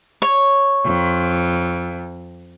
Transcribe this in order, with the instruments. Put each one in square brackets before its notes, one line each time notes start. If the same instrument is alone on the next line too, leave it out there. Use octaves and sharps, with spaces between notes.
[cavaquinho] C#5
[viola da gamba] F2